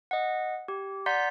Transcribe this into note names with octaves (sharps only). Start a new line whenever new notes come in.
D#5 F#5
G4
D5 F#5 A#5 C6 G6 B6